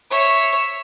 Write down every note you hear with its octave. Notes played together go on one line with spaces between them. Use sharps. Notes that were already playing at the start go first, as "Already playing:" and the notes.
C#5 E5